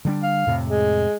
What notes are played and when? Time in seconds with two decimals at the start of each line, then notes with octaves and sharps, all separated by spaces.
0.05 D3 G3 D4
0.23 F5
0.47 F2 A2 C3
0.66 G#3